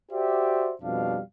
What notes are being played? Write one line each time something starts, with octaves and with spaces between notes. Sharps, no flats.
F#4 G4 C5 D5 E5
F2 B2 G3 D4 F5